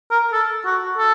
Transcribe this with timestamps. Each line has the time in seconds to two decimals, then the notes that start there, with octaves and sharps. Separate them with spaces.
0.11 A#4
0.32 A4
0.65 F#4
0.98 A4